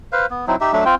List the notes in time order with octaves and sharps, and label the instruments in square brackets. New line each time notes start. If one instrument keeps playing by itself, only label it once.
[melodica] B4 C5 F5
B3
F#3 C4 D#4 E4
D#4 G4 E5
F#3 A3 D4 E5
C4 F4 G5